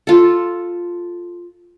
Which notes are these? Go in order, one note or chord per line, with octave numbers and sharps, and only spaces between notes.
F4 A4